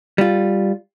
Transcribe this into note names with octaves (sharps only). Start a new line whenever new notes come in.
G3 F4